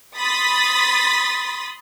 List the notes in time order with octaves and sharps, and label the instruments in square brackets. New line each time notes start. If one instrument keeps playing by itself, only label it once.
[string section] B5 C6 D#6 A6 B6